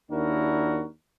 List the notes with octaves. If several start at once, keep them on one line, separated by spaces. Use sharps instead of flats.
D#2 D4 E4 F#4 A#4